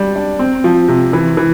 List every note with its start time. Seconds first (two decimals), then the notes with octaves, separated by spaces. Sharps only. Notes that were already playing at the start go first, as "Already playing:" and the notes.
Already playing: G3 D4
0.15 D4
0.39 C4
0.64 F3
0.88 C3
1.13 E3
1.37 E3